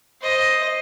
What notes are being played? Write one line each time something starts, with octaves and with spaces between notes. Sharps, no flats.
C5 D#5